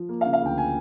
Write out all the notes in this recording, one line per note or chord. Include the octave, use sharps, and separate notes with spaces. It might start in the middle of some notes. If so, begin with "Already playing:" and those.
Already playing: F3
A#3
F5
C#3
F5
D2 G5
G#5